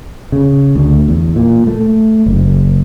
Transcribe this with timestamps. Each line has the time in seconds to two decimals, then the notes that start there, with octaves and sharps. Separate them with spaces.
0.32 C#3
0.75 D2
1.08 E2
1.36 A#2
1.67 A3
2.26 F#1